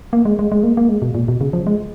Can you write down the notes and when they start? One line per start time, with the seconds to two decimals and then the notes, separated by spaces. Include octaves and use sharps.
0.13 A#3
0.25 G#3
0.39 G#3
0.52 G#3
0.63 A#3
0.77 A#3
0.89 G#3
1.02 B2
1.15 A#2
1.28 B2
1.41 C#3
1.53 F3
1.67 G#3